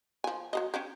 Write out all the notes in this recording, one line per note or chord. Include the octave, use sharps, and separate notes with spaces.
F3 G#5
F#3 G#3 D#5
C#4 D4 G4